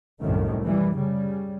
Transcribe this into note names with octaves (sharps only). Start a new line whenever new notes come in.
C2 F#2 A2 D#3 A3
E3 G3
C#3 G3